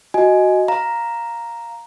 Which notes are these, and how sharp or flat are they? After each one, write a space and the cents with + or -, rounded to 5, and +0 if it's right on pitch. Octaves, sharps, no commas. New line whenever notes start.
F#4 +0 D#5 +5 G#5 +10
F5 +0 A#5 +0